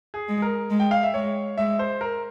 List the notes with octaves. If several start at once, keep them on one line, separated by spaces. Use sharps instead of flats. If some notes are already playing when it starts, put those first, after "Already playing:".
G#4
G#3
A#4
G#3
G5
F5
E5
G#3 C#5
G#3 E5
C5
A#4